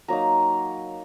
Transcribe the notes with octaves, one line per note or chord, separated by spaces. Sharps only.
F#3 A#3 D#4 A#5